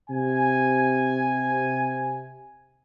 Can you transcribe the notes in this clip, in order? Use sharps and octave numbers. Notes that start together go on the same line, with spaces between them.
C3 G#5